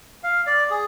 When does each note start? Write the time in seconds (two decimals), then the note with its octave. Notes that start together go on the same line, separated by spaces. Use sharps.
0.24 F5
0.47 D5
0.70 G#4